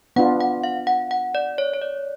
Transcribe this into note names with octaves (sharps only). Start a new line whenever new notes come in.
B3 D4 F4 F#5
F#5
F5
F#5
F#5
D5
C#5
C#5
D5